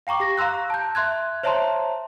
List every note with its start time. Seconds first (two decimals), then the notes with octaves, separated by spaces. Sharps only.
0.07 F5 G5 A#5 C#6 D6
0.20 G4 A#6
0.37 F5 A#5 C6 E6 F#6
0.70 A5 G6
0.95 E5 C6 F#6 G#6
1.43 C5 C#5 E5 A5 A#5 C6